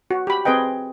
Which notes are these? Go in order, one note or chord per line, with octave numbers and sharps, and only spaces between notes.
F#4
G4 B5
C4 G#4 B4 D#5 G5